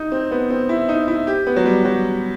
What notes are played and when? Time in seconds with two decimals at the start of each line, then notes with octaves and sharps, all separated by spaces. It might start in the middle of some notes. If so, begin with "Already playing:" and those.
Already playing: D#4
0.12 C4
0.31 B3
0.50 C4
0.69 E4
0.89 D#4
1.08 E4
1.27 G4
1.47 B3
1.56 F#3
1.66 G3
1.85 F#3